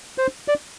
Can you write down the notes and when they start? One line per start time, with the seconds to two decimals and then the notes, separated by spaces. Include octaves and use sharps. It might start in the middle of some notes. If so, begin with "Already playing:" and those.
0.18 C5
0.48 D5